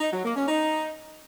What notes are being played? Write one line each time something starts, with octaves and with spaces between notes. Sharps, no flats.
D#4
F#3
A#3
C#4
D#4